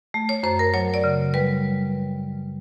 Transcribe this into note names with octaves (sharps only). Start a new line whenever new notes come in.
A3
C#5
F#2 C5
A#4
F#3 C#5
D5
C#3
G3 B4